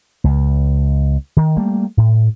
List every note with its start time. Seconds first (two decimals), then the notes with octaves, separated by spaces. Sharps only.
0.24 C#2
1.37 D#3
1.56 G3 A3 A#3
1.97 A2